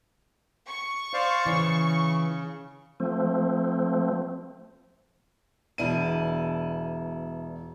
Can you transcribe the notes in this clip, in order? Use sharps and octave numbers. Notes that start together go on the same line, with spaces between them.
C#6
C5 D5 F5
C#3 E3
F3 A3 C4
E1 B2 D4 E4 D#7